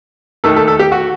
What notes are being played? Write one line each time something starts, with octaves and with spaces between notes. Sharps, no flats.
D#2 D#3 A3 A4
A4
A4
G4
F#4